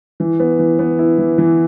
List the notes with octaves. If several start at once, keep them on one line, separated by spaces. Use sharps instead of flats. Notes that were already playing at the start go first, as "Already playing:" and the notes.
E3
B3
E3
B3
E4
E3
E3